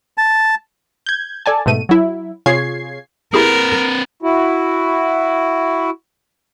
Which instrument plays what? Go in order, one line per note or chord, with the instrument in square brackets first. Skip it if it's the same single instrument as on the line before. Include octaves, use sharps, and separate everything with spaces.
[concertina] A5
[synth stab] G6 G#6
A4 D5 G#5 A5
G#2 B2 A3 D#7
F#3 E4
C3 F4 G#4 C#5 G#6 C7
[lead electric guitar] C4 B4 [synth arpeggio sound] E4 G4 G#4 [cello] A#4
[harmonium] E4 F#4